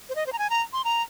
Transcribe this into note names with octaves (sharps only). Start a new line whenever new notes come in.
C5
D#5
C5
A#5
G#5
A#5
C6
A#5